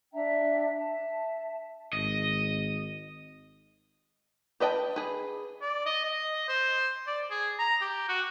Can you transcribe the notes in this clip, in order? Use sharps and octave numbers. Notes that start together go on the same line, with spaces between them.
D4 E5 G5 A#5
E5 A5
G#1 D#5
G4 B4 D#5 G5 A5
G#4 B4
D5
D#5
D#5
C5
D5
G#4
A#5
G4
F#4